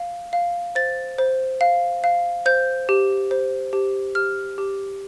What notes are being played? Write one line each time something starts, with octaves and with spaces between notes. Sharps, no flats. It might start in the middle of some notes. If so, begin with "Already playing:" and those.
Already playing: F5
F5
C5 A6
C5
F5
F5
C5 G6
G4
C5
G4
G4 F6
G4